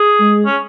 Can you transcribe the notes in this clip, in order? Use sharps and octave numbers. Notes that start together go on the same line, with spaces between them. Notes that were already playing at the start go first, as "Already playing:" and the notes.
Already playing: G#4
G#3
C#4